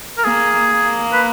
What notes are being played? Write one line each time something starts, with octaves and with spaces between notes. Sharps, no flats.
A#4
A#3 G#4
A#3
B4